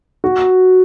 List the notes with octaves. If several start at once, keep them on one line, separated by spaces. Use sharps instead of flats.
F#4